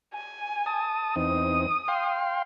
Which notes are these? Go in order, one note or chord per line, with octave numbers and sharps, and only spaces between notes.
G#5
A5 D#6
E2 C4 D#4 D#6
F5 G5 C6